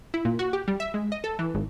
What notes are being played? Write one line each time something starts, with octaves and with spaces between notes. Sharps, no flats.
E4
A#2
F#4
G4
G3
E5
G#3
D#5
A4
E3
G#1